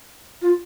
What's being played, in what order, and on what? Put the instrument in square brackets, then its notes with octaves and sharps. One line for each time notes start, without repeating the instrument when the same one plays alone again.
[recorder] F4